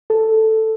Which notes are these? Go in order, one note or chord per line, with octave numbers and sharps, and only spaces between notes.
A4